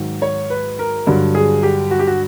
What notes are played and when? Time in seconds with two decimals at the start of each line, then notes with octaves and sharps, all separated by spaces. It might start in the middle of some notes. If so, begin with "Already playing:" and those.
Already playing: G#2 D#3 F#3
0.22 C#5
0.50 B4
0.79 A#4
1.07 G2 D3 F#3
1.35 G#4
1.63 G4
1.91 F#4
1.99 G4
2.07 F#4